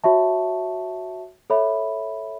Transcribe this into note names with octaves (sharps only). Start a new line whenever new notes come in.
F#4 C#5 E5 A5 C#6
A4 C#5 E5 B5